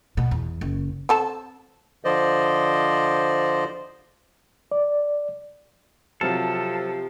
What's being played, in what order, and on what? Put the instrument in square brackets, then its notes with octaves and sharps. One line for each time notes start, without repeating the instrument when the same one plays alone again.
[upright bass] B2
E2
F#1
[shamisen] C4 A4 A5
[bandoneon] D3 F3 C5 D5 D#5
[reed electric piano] D5
[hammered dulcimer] C3 [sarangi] F3 [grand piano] F#3 C4 F6 [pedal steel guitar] A4